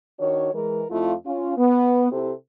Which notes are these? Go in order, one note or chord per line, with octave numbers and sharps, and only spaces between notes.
D#3 D4 F#4 C#5
E3 G#3 A#4
F2 A3 E4 F4
C#4 F4
B3
C3 C4 E4 G4 A4 C5